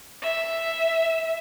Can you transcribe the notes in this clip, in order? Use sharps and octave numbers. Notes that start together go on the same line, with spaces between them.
E5